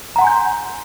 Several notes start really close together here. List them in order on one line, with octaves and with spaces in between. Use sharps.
A#5 F#5 C6 G#5 G6